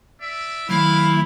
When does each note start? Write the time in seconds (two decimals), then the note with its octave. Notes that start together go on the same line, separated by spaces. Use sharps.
0.20 D5 E5
0.69 D#3 F#3 A3 D4 E4 F5